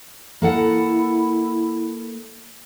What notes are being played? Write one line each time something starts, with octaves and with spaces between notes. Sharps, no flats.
A#3 E4 A4 F#5